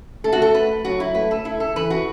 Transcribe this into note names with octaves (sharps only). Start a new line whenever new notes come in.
A3 A4
F#4
A4
B4
F#3 F#4
E4
A3 B4
A4
E4
A4
E3 B4
F#4